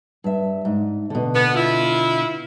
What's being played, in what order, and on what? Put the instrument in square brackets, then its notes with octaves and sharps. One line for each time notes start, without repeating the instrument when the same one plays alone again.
[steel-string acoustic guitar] G2 E5
G#2
B2 D3
[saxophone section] B3
E4 F4